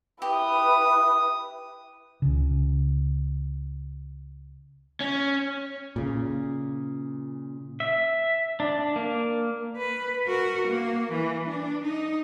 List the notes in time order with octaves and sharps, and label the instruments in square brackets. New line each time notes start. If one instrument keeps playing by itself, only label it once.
[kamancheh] E4 B4 [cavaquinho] G4 [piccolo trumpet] D#6
[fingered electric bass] C#2 C#3
[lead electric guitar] C#4
[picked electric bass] A#2 C#3
[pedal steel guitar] E5
D4
A#3
[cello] B4
F#4 A#4
A#3
E3
D4
D#4